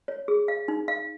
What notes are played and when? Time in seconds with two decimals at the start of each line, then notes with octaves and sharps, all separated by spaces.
0.08 C#5
0.28 G#4
0.48 F5
0.68 D#4
0.88 F5